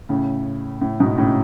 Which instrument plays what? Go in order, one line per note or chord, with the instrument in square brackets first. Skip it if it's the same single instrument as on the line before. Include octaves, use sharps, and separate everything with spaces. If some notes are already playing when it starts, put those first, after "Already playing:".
[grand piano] A2 C#3
A2
G#2 B2
A2 C#3